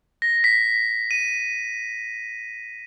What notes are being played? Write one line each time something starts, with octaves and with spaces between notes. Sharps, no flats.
A#6
B6
D#7